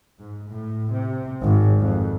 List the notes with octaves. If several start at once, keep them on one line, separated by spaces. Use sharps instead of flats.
G#2
A2
C3
G#1
F2